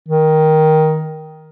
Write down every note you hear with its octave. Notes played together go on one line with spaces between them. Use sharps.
D#3